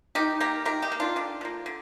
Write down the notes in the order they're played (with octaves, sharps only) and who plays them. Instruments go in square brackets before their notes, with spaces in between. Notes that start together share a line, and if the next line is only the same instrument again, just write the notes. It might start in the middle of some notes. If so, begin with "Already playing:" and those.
[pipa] D#3 D#4 G4
A#3 G4 A#4
D#3 G4 A#4
D#4 G4
A#3
D4 F4
D3 D4
F3 A#3
D3